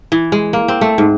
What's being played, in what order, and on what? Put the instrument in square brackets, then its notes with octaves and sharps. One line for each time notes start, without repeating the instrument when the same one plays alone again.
[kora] E3
G#3
A#3
C4
A3
G#2